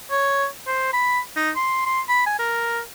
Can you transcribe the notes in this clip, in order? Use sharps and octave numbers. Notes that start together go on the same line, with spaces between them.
C#5
C5
B5
D#4
C6
C6
B5
G#5
A#4